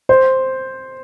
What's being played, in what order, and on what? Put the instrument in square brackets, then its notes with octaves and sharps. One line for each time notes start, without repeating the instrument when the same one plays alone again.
[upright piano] C5